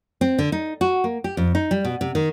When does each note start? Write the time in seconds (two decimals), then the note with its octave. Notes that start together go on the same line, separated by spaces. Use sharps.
0.21 C4
0.38 D3
0.52 D#4
0.81 F#4
1.04 A#3
1.24 G4
1.37 F2
1.55 D#4
1.71 G3
1.85 B2
2.01 C3
2.15 D#3